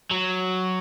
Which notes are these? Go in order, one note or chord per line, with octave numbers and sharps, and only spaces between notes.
F#3